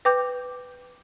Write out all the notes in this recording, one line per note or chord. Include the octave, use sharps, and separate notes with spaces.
B4 G5 D6 G6